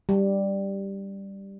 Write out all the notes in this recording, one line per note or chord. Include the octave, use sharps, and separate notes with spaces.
G3